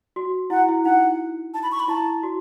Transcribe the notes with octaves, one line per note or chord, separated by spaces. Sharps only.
F#4
E4 F#5
E4
D#4 F#5
A5
B5
C#6
B5
E4 A5
F#4